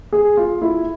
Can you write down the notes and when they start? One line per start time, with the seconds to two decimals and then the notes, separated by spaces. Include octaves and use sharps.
0.13 G#4
0.37 F4
0.62 E4